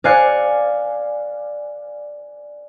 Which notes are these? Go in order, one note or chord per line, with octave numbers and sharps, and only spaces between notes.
D5 F5 G#5 F#6 C7 C#7